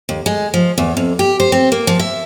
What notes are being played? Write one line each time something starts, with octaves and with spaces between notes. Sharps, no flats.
D#2
G#3
F3
E2
F2
G4
C5
C4
A#3
F3
E5